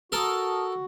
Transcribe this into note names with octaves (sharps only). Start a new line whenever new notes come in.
F#4 A4 A#4 A5 D#6